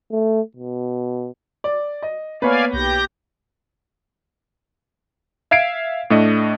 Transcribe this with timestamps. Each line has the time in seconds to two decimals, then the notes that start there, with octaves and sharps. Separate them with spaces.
0.12 A3
0.57 B2
1.64 D5
2.02 D#5
2.42 A#3 B3 B4 C#5 D5 F5 G#5 B5
2.73 B1 G4 G6 A#6
5.51 E5 F5 G#6 C7 D7
6.10 A2 A3 D4 D#5